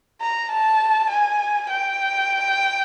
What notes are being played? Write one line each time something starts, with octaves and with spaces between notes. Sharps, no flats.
A#5
A5
G#5
G5